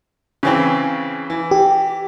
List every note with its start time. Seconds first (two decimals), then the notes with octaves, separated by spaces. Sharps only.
0.43 C#3 E3 C4
1.30 E3
1.51 G4